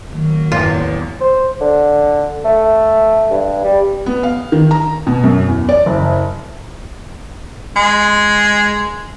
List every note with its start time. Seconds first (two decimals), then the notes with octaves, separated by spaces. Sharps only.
0.13 D#3 F#3 A#3
0.52 A1 E2 F4
1.21 C5
1.61 D3
2.45 A3
3.30 G2
3.64 G3
4.06 B3
4.23 F5
4.52 D#3
4.71 A#5
5.07 B2
5.24 F#2
5.47 E2
5.69 D5
5.86 F#1
7.76 G#3